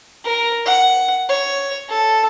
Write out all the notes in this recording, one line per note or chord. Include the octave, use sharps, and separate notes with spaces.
A#4
F#5
C#5
A4